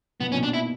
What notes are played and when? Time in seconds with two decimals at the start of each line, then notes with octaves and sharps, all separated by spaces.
0.20 B2 B3
0.28 A#2
0.32 B2 C#4
0.43 D4
0.54 E4